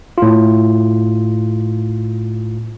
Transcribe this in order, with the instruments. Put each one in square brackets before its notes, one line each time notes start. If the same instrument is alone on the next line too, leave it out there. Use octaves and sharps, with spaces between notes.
[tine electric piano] A2 F4